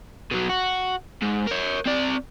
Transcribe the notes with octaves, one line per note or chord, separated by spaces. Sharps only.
B2 F#3
F#4
G#2
A#4 C#5
C4 D5